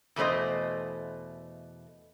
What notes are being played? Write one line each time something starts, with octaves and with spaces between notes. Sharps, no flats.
E2 B2 A3 C5 D#5